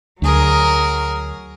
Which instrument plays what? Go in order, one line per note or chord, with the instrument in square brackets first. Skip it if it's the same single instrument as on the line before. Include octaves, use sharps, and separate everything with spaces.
[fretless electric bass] D2 [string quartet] F#3 G#4 A#4